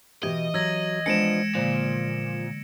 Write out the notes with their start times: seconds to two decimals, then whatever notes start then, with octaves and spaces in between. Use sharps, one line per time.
0.23 B2 E3 G4 D#5
0.54 F#3 E6 G#6 A#6
1.06 F3 G#3 B3 D4 C#7 D7 E7
1.55 A#2 D3 F3 A#3